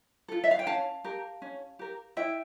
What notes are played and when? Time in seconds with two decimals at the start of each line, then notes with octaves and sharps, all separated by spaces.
0.28 F4 A4
0.44 E5
0.51 F5
0.59 G5
0.67 C#4 F5 A5
1.04 G4 A#4
1.42 C#4
1.79 G4 A#4
2.17 E4 E5 G5